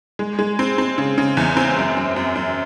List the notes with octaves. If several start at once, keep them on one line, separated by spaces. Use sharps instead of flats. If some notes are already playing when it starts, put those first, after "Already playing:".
G#3
G#3
C4
C4
C#3
C#3
E2
C4
F#2
F#2
F#2
F#2